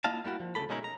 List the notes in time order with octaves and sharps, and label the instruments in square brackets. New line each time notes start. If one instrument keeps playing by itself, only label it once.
[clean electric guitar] A#3 E4 F4 D#5 F5 A5
G3 A#3 E4 F#4
F3
D2 C#3 A3 A#3 A4 B5
B2 G#3 C#4 D#4 E4 A#4
A#5